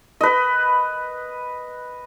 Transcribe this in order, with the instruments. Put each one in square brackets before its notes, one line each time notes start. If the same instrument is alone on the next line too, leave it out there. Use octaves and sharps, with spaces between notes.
[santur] B4 D#5